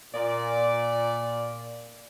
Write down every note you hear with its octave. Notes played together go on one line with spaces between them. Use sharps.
A#2 D5